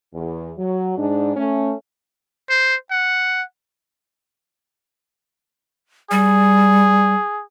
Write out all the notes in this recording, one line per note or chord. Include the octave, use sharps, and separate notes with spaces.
E2
F#3
G#2 D4
A3 C#4
C5
F#5
G3 G#4